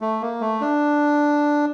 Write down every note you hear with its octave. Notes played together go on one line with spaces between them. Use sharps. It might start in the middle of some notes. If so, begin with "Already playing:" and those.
A3
A#3
A3
D4